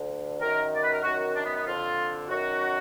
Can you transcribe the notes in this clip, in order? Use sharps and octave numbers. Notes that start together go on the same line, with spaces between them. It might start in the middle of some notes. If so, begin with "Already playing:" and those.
Already playing: D2 D3
F#2 D#3 A#4
D5
B4
A#4
F#2 D#3 F#4
F#4
D4
B3
B3
F2 D3 F4
F#2 D#3 F#4